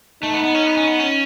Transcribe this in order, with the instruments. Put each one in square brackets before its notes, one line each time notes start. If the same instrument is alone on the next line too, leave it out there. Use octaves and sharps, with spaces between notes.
[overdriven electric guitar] A3 [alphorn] D#4
[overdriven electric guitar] B3
B3
C#4
B3
C#4
B3
C#4